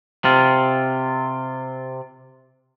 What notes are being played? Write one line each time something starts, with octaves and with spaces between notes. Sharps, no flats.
C3 F4